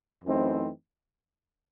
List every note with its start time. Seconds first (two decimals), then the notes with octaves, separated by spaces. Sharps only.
0.25 F#2 E3 A3 C4 D#4